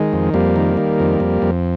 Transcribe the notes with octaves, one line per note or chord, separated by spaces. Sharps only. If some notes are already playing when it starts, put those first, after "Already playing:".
Already playing: D#3 G#3
F2
F2 G3 A#3
D#3
D#3
F2
F2
F2